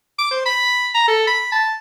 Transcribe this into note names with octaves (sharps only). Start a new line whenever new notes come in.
D6
C5
B5
A#5
A4
B5
A5